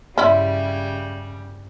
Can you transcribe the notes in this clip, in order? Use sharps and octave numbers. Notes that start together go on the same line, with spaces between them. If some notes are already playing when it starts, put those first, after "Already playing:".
G2 C#3 G3 C#4 E4 D5 E5 C6